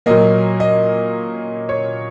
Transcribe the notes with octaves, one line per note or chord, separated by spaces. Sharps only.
A#2 F#3 A#3 D#5
D#5
C#5